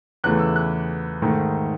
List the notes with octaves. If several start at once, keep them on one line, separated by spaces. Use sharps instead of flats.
E2 C#3 E3 A3 F#6
E6
F#6
G#2 D#3 A3